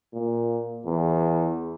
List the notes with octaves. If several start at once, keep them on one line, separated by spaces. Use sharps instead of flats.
A#2
E2